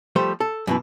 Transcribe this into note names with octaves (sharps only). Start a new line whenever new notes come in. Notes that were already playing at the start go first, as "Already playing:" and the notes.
F3 G3 A3 C5
A4
F#2 B2 E3